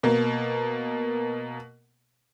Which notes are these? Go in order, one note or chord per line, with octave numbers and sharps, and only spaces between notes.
B2 A#3